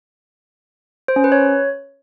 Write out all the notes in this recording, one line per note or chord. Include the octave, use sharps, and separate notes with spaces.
C5
C#4
B4
C#5